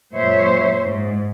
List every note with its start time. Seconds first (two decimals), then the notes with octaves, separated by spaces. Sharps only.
0.15 F#2 A#2 G#3 C5 C#5 E5
0.84 G#2